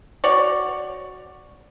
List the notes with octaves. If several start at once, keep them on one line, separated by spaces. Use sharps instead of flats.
F#4 C#5 D5